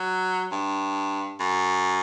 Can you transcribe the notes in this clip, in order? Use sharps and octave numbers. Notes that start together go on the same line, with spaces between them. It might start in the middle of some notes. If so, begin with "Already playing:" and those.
Already playing: F#3
G2
F#2